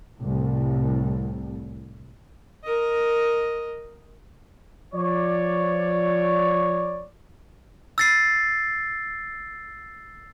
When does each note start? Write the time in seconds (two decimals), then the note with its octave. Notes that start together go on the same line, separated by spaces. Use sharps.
0.20 C2 A2
2.64 A#4 D#5
4.94 F3 C#5 D5
7.98 E6 A6 C7